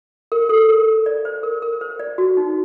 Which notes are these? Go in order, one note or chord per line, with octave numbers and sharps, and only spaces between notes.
A#4
A4
A#4
D5
C5
A#4
A#4
C5
D5
F#4
D#4